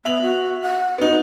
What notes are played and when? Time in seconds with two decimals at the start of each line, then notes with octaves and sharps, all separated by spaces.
0.05 B3 E5 F7 F#7
0.22 F#4
0.62 F#5
0.98 B3 D#4 F#4